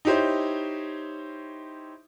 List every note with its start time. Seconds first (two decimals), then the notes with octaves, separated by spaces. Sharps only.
0.05 D#4 E4 G4 C5 C#5